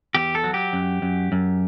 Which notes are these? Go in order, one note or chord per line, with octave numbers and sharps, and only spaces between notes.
E2 G4
A4
F#3
G4
F#2
F#2
F#2